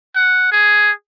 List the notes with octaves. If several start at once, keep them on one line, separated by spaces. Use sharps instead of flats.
F#5
G#4